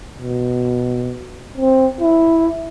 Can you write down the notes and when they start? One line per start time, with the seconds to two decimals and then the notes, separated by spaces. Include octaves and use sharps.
0.18 B2
1.58 C4
2.01 E4